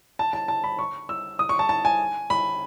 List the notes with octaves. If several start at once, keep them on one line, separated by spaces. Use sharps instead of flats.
A5
A5
A5
B5
C#6
E6
D#6
C#6
A5
A5
G#5
B5